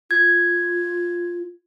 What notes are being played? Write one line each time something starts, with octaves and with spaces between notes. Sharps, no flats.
F4 G#6